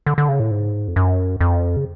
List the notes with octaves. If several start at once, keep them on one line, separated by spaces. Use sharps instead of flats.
D3
D3
C#3
A2
G#2
F2
F#2
F2
C#3